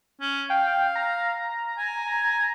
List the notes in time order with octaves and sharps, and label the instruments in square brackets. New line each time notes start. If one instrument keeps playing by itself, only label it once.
[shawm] C#4
[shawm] F5 [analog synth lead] G5
[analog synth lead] A#5
[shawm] G#5